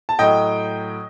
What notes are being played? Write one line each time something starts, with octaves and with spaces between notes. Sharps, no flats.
A5
A2 F#3 D#5 G5